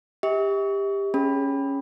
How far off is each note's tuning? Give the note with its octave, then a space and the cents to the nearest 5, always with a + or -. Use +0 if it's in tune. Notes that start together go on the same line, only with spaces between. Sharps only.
G4 +20 E5 -45
C#4 +0 G#4 +0 B5 +0